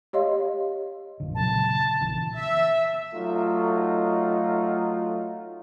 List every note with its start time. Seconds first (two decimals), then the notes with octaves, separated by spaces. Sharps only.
0.13 G4 C#5 D#5 F5 C6
1.20 A#1 F2 D3
1.35 A#2 C#3 F#3 A5
2.00 A#1 C#3 E3
2.34 E5
3.14 F#3 A3 D#4 F4